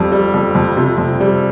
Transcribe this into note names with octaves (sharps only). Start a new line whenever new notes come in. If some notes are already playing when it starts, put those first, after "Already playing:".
Already playing: F2 G3
G3
F2
F2
C3
F2
G3